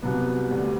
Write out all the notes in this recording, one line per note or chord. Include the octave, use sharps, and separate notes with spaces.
C2 C3 F#3 B3
D2 C3 G3